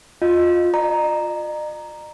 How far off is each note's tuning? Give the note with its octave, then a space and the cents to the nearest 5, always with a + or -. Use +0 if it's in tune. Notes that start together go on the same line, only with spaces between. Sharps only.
F4 +15 D#5 +0
D#5 -45 A#5 +0